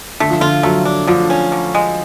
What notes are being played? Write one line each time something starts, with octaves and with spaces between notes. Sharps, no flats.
D3 A3
F3
D3 F4
F#3 A3
D4
D3 F3
C#4
D3
G#3